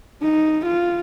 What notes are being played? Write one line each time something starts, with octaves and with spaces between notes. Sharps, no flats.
D#4
F4